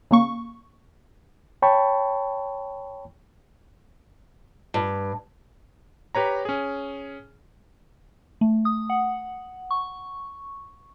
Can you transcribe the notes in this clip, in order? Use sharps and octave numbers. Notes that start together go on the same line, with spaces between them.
C#3 A#3 C#6
C#5 G5 A5 B5 C#6
G2
G4 B4 C#5 A#5
C#4 G#4
A3
D#6
F#5
C#6